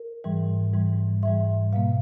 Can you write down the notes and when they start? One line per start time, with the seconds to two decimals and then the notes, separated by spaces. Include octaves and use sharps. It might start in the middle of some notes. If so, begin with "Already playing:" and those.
Already playing: A#4
0.24 G#2 E3 G3
0.73 G#2 E3 G3
1.23 G#2 E3 G3 E5
1.73 B2 G3 A#3 F5